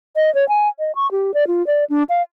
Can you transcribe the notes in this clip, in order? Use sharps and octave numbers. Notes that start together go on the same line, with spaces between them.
D#5
C#5
G#5
D#5
C#6
G4
D5
F4
D5
D4
F5